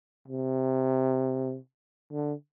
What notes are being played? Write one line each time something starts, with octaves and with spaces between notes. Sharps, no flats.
C3
D3